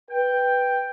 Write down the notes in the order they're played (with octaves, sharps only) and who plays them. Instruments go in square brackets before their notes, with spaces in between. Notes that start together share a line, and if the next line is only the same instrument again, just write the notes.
[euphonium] B4 [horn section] G5